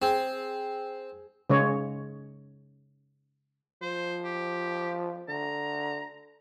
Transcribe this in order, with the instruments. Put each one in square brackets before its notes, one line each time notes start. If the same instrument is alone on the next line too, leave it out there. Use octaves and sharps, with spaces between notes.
[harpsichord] C4 [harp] G#4
[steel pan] C#3 G#3 C#5
[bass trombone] F3 [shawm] C5
[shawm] G4
[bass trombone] D3 [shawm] A#5